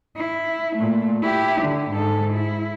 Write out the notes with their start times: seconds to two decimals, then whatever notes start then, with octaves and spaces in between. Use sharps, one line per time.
0.16 E4
0.76 A#2 A3
1.22 E4 G4
1.61 D3
1.90 G#2 A4
2.33 E4